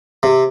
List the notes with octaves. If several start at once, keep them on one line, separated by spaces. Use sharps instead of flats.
C3